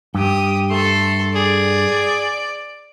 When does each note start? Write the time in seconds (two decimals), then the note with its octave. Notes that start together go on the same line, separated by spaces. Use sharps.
0.15 G2 G4 D#6
0.71 A3 A4 C6
1.35 G#4 D5